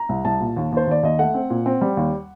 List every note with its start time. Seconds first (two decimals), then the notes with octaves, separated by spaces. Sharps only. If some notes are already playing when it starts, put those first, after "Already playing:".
Already playing: A#5
0.09 C2
0.25 C2 A5
0.41 A#2
0.56 D#2
0.72 D#2 C5
0.87 D#2 D5
1.03 D#2 D#5
1.19 A3 F#5
1.34 C4
1.50 A#2
1.66 C4
1.81 G3
1.97 D#2